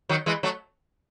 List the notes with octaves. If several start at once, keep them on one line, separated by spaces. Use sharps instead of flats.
D#3 F#3
E3 G#3
F#3 A3